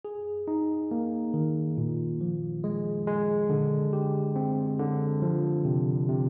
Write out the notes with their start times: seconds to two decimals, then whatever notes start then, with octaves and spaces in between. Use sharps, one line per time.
0.05 G#4
0.48 D#4
0.91 A#3
1.34 D#3
1.78 A#2
2.21 F3
2.64 G#3
3.07 G#3
3.49 D3
3.93 G4
4.36 C4
4.79 D3
5.22 F3
5.65 C3
6.08 C3